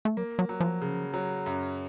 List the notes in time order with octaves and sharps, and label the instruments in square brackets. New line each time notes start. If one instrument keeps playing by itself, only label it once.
[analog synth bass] A3
[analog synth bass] F#3 [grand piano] A#3
[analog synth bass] F#3
[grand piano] F#3
[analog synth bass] F3
[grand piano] C#3
F#3
F#2